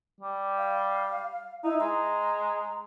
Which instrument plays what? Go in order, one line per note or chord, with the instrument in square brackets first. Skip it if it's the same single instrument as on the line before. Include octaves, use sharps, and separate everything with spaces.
[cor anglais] G3
[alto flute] F5
[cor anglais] D#4 [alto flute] E4
[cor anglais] G#3 [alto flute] A#5